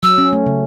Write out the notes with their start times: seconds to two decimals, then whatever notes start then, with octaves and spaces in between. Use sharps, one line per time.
0.03 F#3 E6
0.18 C#4
0.33 A3
0.46 C#3